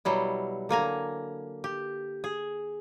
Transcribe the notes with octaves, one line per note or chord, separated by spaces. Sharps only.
B2 F#3 G3 E4
D3 A#3 G#5 A#5
G4
G#4